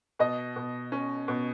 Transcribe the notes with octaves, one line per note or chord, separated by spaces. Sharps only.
B2 D#5
B2
C#4
B2